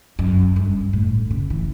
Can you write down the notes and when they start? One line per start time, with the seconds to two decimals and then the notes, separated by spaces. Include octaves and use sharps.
0.19 F#2
0.56 G2
0.93 A2
1.30 C#3
1.50 E3